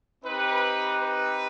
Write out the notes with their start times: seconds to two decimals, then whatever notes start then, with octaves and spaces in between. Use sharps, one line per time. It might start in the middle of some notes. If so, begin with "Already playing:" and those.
0.25 C4 D#4 G4 B4
0.99 B4